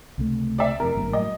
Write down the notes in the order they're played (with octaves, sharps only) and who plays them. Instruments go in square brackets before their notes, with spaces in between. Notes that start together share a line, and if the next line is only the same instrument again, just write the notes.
[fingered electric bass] C#2 C3 A3
[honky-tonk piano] D5 E5
[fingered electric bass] F2 C3 [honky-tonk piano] A#4
[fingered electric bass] G#1 G2 A#3
[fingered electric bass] A2 F#3 [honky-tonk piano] D#5